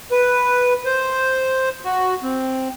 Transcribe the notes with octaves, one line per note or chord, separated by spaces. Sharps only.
B4
C5
F#4
C4